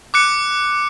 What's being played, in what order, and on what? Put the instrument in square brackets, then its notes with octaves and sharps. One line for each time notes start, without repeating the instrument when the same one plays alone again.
[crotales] D6 F#6 C#7